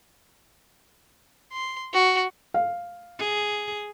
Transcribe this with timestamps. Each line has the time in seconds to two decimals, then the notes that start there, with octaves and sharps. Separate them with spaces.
1.53 C6
1.94 F#4
2.54 F5
3.19 G#4